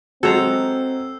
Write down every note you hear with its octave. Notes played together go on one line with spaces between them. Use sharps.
F#3 G#3 C4 A4 A#5 E6 G6 C7